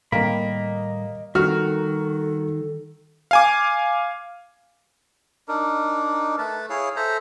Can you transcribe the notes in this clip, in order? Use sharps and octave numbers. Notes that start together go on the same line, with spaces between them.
A2 D#3 G3 A#3 D#5 B5
D#3 G3 F#4 A4 F6
F5 G#5 D6
D4 D#4 A#4
A3 B4 A5
E4 G#4 C#5 F5
A4 C5 E5 A#5